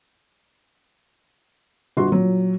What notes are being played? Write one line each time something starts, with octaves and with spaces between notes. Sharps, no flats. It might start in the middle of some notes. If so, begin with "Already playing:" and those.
G1 F#4 C6
A#2 F#3